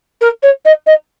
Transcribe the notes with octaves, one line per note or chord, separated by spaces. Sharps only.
A#4
C#5
D#5
D#5